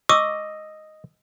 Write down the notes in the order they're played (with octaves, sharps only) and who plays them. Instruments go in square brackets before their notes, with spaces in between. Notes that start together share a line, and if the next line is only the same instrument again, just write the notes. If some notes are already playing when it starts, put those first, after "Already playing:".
[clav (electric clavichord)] D#5 [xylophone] C#6 D6 [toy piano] E6